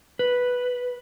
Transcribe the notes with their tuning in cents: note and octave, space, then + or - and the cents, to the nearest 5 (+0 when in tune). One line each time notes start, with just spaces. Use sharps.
B4 -5